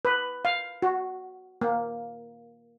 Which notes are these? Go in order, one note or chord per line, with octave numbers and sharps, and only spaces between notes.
B4
F5
F#4
A#3